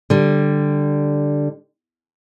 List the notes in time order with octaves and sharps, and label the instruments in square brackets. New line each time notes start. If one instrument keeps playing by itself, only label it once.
[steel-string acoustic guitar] D3 G3